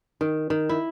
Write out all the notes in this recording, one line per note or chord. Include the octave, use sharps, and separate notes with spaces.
D#3
D#3
E4